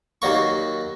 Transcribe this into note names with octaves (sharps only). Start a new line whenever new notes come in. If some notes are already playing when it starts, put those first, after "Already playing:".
D#2 F#3 A#3 C#6